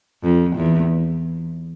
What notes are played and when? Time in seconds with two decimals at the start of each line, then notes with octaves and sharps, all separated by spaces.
0.24 F2
0.57 E2